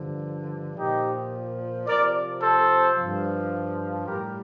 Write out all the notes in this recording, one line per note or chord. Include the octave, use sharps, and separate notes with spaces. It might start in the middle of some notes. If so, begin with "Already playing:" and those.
Already playing: G2 D3 F3
A#2 F3 D#4 G4
C3 F3 A#4 D5
A4 C5
G2 F3
A2 G3 G4 A#4